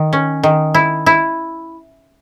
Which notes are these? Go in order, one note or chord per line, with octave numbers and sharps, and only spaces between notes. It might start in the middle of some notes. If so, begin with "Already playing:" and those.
Already playing: D#3
C#4
D#3
E4
E4